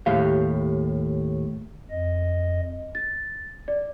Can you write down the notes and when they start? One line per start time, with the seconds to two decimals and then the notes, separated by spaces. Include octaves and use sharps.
0.06 D#2 A2 G4 F5
1.90 F2 D#5
2.95 A6
3.68 D5